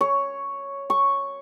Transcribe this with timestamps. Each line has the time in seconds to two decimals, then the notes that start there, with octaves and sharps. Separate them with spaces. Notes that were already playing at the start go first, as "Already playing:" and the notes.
0.01 C#5
0.90 C#6